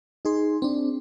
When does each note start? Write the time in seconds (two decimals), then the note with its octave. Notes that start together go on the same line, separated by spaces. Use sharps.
0.25 D#4 G#4 C6
0.62 C4 D4